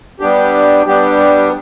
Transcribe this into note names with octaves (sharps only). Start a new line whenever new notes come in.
G3 B3 D4 G4
G3 B3 D4 G4